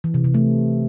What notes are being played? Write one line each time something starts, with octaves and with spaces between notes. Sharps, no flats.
E3
C3
C3
A3